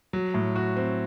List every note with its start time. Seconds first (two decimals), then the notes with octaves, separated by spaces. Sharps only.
0.13 F#3
0.34 A2
0.56 F#4
0.77 C4